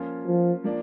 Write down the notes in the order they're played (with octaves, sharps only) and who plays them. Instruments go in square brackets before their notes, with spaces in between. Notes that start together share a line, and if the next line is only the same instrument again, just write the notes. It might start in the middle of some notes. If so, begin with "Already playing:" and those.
Already playing: [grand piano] F3 A#3 C#4 F4
[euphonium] F3
[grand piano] F3 A#3 D4